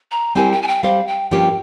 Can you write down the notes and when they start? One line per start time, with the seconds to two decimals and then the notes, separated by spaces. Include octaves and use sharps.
0.11 A#5
0.35 G3 C4 E4 G4 A#4 G#5
0.52 G5
0.62 G#5
0.68 G5
0.83 G3 C4 G4 C5 F5
1.07 G5
1.31 G2 F3 A#3 C#4 G4 G5